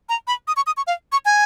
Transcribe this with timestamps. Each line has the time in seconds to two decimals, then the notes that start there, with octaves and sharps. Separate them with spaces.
0.09 A#5
0.27 B5
0.48 D#6
0.57 C#6
0.67 D#6
0.77 C#6
0.87 F5
1.12 C#6
1.25 G#5